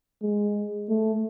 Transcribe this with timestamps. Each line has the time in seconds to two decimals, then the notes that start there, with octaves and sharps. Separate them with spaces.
0.22 G#3
0.89 A3